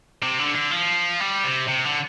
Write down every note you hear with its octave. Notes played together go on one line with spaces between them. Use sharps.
C3
D3
D3
F3
G3
C3
C3
D3